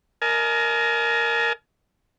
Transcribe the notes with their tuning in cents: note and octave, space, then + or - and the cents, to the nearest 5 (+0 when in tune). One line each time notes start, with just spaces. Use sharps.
A#4 +0 D#5 +0 G#5 +40